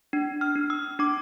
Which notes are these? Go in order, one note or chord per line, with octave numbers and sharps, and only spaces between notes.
D4
F6
D4
E6
D4 D6